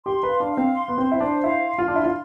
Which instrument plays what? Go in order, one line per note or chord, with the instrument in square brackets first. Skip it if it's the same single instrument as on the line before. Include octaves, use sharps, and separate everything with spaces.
[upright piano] G4 [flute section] C6
[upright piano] B4
[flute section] F5
[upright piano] D4
[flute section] F5
[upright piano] C4
[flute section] C6
[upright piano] B3
[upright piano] C4 [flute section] C5
[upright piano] E4
[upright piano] D4 [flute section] C5
[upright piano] E4 [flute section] F5
[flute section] C6
[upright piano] F4
[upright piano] D4 [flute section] C6
[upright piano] E4
F4